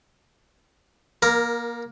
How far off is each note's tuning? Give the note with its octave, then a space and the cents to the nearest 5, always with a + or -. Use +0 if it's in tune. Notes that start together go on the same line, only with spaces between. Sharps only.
A#3 +25 A#4 +0